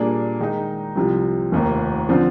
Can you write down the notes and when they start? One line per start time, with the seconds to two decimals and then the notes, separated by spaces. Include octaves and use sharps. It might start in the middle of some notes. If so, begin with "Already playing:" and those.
Already playing: A#2 G3 A#3 D4 G#4
0.40 D#3 G#3 D#4
0.96 C2 C3 F3 C4
1.52 F1 D#2 D#3 A#3
2.09 D3 F3 C4